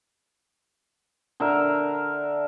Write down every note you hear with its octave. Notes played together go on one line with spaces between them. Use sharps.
D3 A#4 E5